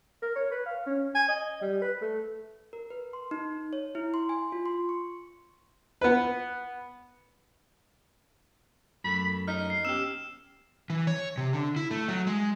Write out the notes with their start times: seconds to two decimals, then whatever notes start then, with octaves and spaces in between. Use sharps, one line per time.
0.22 A#4
0.36 C#5
0.51 B4
0.66 F5
0.86 C#4
1.15 G#5
1.28 D#5
1.62 G3
1.82 B4
2.01 A3
2.73 A#4
2.90 B4
3.13 C6
3.31 D#4
3.73 C#5
3.95 E4
4.14 C6
4.29 G#5
4.52 F4
4.66 C6
4.89 C#6
6.01 B3 B4
9.04 F#2 A3 B5
9.48 D#4 F6
9.70 C7
9.85 B3 C#4 G4 E6 E7
10.90 E3
11.07 C#5
11.37 C3
11.53 D3
11.76 E4
11.91 A3
12.08 F#3
12.27 G#3